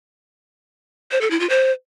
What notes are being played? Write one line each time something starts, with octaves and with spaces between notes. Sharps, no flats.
C5
A4
E4
F4
C5